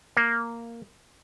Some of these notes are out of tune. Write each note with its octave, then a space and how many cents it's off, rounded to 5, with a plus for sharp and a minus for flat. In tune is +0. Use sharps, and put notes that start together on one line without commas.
A#3 -5